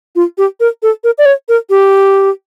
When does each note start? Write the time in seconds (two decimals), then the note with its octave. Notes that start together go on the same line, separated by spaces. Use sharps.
0.16 F4
0.38 G4
0.60 A#4
0.83 A4
1.04 A#4
1.18 D5
1.26 C#5
1.49 A#4
1.70 G4